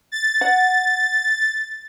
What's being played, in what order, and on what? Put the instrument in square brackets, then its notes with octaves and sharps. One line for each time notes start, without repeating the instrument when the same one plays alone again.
[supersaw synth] A6
[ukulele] F#5